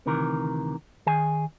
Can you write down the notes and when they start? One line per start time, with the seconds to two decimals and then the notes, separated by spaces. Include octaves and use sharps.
0.06 D2 C3 D#3 E3 A#4
1.06 D#3 G#4 G#5